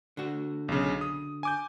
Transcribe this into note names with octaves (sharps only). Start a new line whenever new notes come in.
D3 F#4
B1 C#3
D#6
G#5 D6 G6